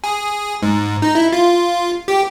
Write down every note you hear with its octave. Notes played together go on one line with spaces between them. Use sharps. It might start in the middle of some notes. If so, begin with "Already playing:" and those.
G#4
G#2
D#4
E4
F4
G4